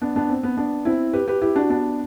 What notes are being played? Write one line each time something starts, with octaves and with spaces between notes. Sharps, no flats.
B3 D4
B3 D4
C4
B3
B3 D4
C4 E4
G4 B4
G4 B4
E4 G4
D4 F#4
B3 D4